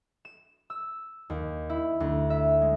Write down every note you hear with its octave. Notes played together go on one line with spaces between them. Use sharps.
E7
E6
D#2
E4
D2
E5
G#3